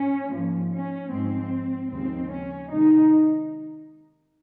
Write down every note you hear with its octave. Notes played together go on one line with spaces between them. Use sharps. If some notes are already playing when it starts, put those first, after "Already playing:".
Already playing: C#4
G#2 F3 A#3
C#4
G#2 F3 G#3 C4
D#2 C#3 F3 G#3 C4
C#4
C3 D#3 G#3 D#4